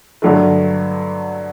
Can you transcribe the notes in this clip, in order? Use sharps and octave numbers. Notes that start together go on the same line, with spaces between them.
G2 D3 F#3 A3